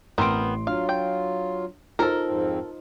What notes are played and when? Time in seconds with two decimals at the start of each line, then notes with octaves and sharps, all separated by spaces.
0.18 A1 B3 C4 A#4 C6 D7
0.67 F#3 D4 F4 F5
0.89 G5
1.99 D#4 F4 A4 A#4 C5
2.26 F2 G#2 C4